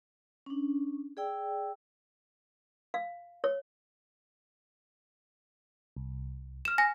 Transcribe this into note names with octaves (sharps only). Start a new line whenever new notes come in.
C#4 D4
G#4 D5 G5 E6
F5
C#5
C2
F6 E7
G#5 A#6